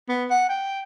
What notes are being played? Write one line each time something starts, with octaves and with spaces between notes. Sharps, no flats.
B3
F#5
G5